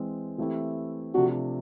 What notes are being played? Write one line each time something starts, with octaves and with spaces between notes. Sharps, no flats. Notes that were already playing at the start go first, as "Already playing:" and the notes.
Already playing: E3 G#3 C4
E3 A3 C4 E4 G4
C3 F3 A3 D4 F#4